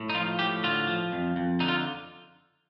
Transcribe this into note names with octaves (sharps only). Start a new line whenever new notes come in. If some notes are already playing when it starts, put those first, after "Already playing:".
Already playing: A2
D#4
F3 F4
A2 G4
D3 F4
F3
F2
F2
D3 D#4
F4